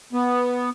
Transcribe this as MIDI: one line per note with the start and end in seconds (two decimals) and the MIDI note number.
0.13 0.70 59